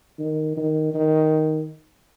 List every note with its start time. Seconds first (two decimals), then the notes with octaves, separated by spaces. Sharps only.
0.19 D#3
0.57 D#3
0.94 D#3